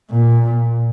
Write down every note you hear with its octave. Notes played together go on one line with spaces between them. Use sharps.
A#2